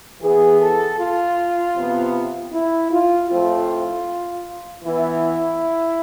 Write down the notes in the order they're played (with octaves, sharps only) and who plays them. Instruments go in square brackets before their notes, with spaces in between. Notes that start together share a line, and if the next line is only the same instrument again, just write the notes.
[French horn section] E3 B3 G#4
A4
F4
C3 F3 B3
E4
F4
A2 F3 A3 C4 F4
E3 B3 E4